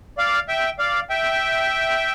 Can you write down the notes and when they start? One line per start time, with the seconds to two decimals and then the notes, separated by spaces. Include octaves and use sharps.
0.18 D5 F5
0.48 E5 G5
0.79 D5 F5
1.10 E5 G5